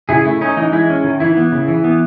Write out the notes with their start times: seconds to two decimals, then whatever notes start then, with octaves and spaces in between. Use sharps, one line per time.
0.09 C#3 E4 G#4
0.25 A3 E4
0.41 C#4 D#4
0.57 E3 D#4
0.72 G#3 E4
0.90 C#4
1.04 D#3
1.20 E3 E4
1.37 B3
1.52 C#3
1.68 E3
1.84 B3